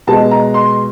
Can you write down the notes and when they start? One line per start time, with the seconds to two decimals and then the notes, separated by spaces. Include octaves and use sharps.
0.07 B2 G#3 B3 A5
0.31 A#5
0.54 C6